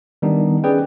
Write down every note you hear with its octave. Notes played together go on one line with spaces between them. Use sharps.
D#3 G3 B3 D4 D#4
C#4 G#4 B4 D5 G5